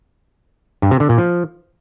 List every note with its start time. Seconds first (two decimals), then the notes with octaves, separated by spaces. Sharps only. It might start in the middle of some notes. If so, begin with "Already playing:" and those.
0.82 G2
0.91 C3
1.00 D3
1.09 A#2
1.18 F3